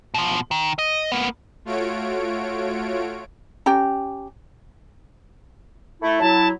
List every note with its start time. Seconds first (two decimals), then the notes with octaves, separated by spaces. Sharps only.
0.14 B2 F3
0.51 D#3
0.79 D#5
1.12 A#3 B3
1.65 A3 F4 F#4 C#5 D7
3.66 C#4 G4 G5 A#5
6.01 A3 E4
6.20 F#3 E4 A5